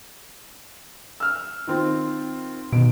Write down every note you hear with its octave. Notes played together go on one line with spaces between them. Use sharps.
E6 F6
D#3 C4 F4
D#2 B2 D7